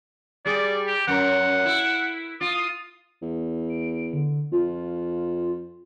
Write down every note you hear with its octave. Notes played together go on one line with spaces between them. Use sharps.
G3 G#4 D5
G4
F#2 A#4 F#5
E4
F4 D#6
E2
D7
D3
F2 F4